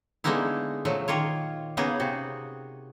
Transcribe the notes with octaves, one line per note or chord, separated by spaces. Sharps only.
D3 G#3 A#3 B3 D#4 E4
A#2 F3 F#3 A3
D#3 A#3 F4 C#5
C#3 A#3 B3 D#4 G#4
C3 F#4